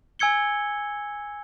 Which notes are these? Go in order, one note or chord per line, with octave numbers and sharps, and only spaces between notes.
G#5 E6 G#6 C#7 G7